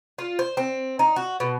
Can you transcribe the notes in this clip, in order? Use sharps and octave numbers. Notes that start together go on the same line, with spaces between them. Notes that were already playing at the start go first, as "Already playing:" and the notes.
F4
C5
C4
D#4
F#4
B2